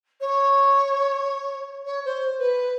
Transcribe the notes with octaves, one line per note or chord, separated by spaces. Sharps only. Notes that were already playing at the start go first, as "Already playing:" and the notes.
C#5
C#5
C5
B4